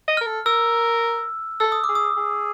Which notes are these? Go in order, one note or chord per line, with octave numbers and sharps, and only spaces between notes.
D#5
F6
A#4
A4
A#4 E6
A4 E6
D#6
D6
G#4
D#6
G#4